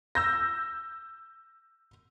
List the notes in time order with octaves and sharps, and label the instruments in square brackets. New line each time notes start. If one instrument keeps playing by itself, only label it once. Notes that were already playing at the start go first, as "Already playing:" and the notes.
[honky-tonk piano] E6 G6 A#6